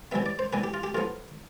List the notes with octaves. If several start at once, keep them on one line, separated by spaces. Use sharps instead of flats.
C3 E3 G3 B3 E5
D5
C5
C3 E3 G3 B3 B4
G4
F4
G4
A2 F3 B3 F4